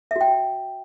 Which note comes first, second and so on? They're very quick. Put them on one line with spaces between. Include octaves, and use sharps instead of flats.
E5 F#4 G5